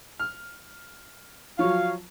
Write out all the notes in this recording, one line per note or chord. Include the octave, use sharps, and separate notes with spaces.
F6
F3 F#3 C#5 F5